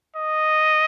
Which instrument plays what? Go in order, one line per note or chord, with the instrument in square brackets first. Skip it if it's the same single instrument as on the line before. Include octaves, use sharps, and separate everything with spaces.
[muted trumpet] D#5